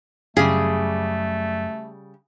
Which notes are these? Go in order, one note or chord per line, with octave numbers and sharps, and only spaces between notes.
F#2 C#3 G3 A3 G#4